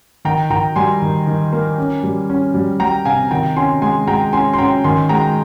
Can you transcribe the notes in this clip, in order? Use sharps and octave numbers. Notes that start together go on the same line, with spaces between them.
D#3 G5 A#5
D#3 G5 A#5
G3 G#5 C6
D#3
D#3
A#3
C#4
G3
C#4
G3
G3 G5 A#5
C3 F5 G#5
D#3 G5 A#5
C#4 G#5 C6
G#3 G#5 C6
G#3 G5 A#5
C#4 G#5 C6
C6
C#4 G5 A#5
D#3 G#5 C6
G#3 G5 A#5